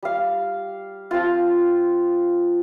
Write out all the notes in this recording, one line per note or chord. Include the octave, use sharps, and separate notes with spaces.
G3 F5
F3 C4 F4